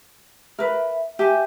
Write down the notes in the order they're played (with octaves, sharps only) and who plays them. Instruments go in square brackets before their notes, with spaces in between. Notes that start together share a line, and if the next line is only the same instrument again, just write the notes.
[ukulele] A#4 B4 [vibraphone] E5
[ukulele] G4 G#5 [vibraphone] E5